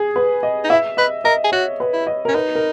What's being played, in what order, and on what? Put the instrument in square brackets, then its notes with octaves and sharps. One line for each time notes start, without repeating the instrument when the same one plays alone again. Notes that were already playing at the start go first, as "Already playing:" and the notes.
Already playing: [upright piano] G#4
B4
D#5
[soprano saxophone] D#4
[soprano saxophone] E4 [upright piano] E5
[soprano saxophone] B4 [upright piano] D#5
[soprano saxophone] A#4 [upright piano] D#5
[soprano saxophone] G#4
[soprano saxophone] F#4 [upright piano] C#5
[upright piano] B4
[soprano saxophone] E4
[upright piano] D#5
[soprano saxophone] C#4 [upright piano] A#4
[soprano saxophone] D#4 [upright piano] B4
[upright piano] A#4